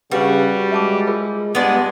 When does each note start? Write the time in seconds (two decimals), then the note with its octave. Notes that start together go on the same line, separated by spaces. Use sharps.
0.11 C#3 G3 D4 F#4 G4 B4
0.72 G#3 E5 A5 D6
1.07 F4 G#4 A#4
1.55 G2 G#3 B3 D5